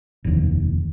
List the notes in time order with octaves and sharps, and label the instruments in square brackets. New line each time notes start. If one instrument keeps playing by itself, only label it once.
[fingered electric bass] F1 D#2